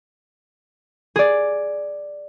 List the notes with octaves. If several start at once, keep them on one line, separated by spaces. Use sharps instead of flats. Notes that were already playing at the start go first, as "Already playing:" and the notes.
G#4 D5